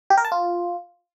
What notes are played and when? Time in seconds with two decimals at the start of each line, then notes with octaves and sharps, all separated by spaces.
0.10 G4
0.17 A#4
0.25 A5
0.32 F4